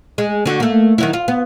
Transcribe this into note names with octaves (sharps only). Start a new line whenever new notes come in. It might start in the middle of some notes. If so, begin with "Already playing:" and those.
G#3
D3 F#4
A3 A#3
D#3 F#3 E4
F4
B3